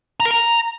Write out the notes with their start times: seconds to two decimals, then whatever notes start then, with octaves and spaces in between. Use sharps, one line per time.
0.20 A#5
0.25 A#4
0.31 A#5